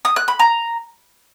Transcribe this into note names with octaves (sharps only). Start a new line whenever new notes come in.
D#6
F#6
B5
A#5